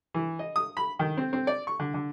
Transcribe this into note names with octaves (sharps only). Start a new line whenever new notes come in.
E3
D#5
D#6
B5
D#3
C4
C4
D5
C#6
D3
D3